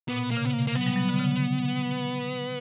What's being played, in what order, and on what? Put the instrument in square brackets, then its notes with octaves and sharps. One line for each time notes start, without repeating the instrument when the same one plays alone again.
[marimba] A#2 [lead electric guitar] B3
[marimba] B2
[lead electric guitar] A#3
[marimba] C#3
[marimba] C3 [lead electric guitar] B3
[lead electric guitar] A#3
A#3
[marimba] F#3 [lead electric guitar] B3
[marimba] G3
F#3
D3
C#3